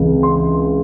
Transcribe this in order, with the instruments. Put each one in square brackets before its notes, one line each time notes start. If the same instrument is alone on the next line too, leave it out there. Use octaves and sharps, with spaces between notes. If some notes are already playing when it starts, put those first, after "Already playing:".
Already playing: [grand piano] C#2 C3 E3
C6